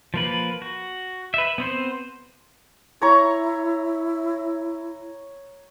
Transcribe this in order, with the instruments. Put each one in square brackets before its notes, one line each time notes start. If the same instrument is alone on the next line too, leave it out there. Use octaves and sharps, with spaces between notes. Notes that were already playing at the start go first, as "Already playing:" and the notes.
[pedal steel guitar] F3 A#3 B4
F#4
B4 E5
B3 C4 C5
[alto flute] E4 [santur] C#5 A#5 C#6